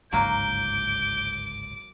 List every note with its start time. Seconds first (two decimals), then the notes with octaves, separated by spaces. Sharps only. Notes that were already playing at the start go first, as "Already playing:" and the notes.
0.13 G1 C#2 G#2 F#3 A#3 D6 G6